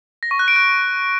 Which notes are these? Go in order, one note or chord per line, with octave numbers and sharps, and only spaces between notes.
A#6
C#6
F#6
D7
F#6